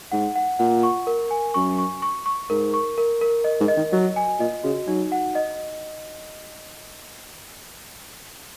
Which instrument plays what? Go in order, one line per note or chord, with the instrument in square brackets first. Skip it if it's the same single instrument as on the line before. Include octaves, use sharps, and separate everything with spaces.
[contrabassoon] G#2 [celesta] F#5
[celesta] F#5
[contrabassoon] A#2 [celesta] F#5
[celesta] C#6
A#4
G#5
[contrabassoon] F#2 [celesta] C#6
[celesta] C#6
C#6
C#6
[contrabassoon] G#2 [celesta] A#4
[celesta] C#6
A#4
A#4
D#5
[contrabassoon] G#2
[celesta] D#5
[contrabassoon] D#3
[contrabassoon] F#3 [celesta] D#5
[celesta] G#5
[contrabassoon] A#2 [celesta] D#5
[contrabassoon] C#3 [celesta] F#4
[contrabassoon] F#3 [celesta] D#4
[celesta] F#5
D#5